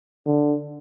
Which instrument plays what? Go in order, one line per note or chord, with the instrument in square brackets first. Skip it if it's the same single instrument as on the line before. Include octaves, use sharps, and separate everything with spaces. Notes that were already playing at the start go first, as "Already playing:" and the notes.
[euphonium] D3